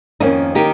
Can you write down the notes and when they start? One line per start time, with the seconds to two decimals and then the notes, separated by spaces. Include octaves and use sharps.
0.20 F2 D#3 A#3 C#4 D#4
0.55 D#3 A#3 D#4 G4